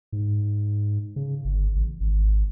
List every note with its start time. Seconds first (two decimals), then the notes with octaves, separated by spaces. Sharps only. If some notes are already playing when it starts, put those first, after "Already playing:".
0.13 G#2
1.16 C#3
1.45 G1
1.75 A1
2.00 G#1